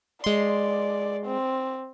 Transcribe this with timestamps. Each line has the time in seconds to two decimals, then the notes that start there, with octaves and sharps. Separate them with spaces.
0.24 G#3 D5 C6
1.26 C4